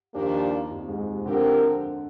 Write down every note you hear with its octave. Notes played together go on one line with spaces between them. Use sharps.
D#2 A#2 D#3 F3 A#3 D4 G4
F2 F3
G#2 G#3
C3
D3 F3 C4 G4 A#4